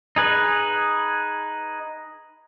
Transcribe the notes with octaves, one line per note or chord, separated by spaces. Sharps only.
D#4 G#4 B4